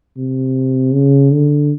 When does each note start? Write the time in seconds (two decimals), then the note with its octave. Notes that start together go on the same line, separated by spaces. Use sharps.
0.17 C3
0.93 C#3
1.32 D3